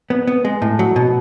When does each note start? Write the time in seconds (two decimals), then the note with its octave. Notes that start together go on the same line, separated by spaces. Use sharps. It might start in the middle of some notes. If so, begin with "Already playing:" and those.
0.10 B3
0.27 B3
0.45 G#3
0.62 A2
0.79 F#3
0.96 B2